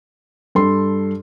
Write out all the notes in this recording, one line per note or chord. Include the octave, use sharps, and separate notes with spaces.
G2 A4 C6